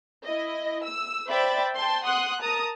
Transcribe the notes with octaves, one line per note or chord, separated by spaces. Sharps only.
E4 D#5
E6
C5 D5 E5 G5 B5 A6
G5 A5 C6
F#5 C6 D#6 F#6
A#4 A5 A#5 D#6